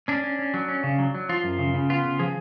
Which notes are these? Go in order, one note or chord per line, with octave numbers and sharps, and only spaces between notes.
C#4 D4
C#4
C#4
F#3
C#4
C#3
F#3
F#3
F3 F4
F#2
C#3
C#3
B3 F4
C#3
F3 G#4